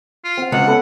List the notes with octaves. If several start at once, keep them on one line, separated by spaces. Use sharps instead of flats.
F4
C4 F#5
C#2 C#5 F#5
B3 A4 B4